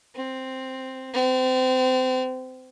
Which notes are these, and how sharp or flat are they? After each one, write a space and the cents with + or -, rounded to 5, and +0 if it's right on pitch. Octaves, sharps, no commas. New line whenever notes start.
C4 +0
C4 -30